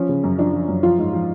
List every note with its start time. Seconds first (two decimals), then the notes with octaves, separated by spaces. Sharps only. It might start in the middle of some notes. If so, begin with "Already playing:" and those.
Already playing: F3 C#4
0.09 C#3
0.23 F#2
0.38 F3 D4
0.53 F3
0.68 F#2
0.83 F3 F4
0.98 G#2
1.13 F3